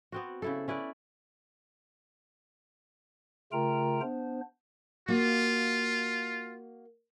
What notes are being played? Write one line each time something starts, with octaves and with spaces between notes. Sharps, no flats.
B3 C4 F#4
C#3 E4 A4
C#4 E4 B4 D5
C#3 A3 F4 A#4 G5 A#5
B3 D4 C5
A#3 F4 F#4